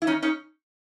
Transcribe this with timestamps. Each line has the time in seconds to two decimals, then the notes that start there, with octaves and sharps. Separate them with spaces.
0.02 E4
0.07 C#4 D#4
0.22 C#4 D#4